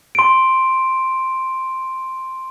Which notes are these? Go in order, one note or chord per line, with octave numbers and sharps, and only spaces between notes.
C6 D7